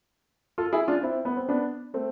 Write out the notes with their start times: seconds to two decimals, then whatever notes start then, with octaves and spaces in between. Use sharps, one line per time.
0.58 F4 A4
0.72 E4 G#4
0.88 D4 F4
1.03 C4 E4
1.25 B3
1.37 C4
1.49 B3 D4
1.94 A3 C4